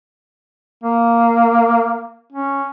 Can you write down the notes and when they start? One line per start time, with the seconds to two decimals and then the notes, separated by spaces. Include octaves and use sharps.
0.84 A#3
2.32 C#4